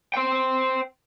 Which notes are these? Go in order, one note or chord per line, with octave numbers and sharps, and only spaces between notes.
C5 G5